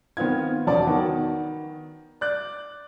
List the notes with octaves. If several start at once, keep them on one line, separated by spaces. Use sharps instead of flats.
D#3 B3 C4 F4 G#6
E1 D3 F3 C#4 D5 A5
D#3 B3 F#4
D5 F#6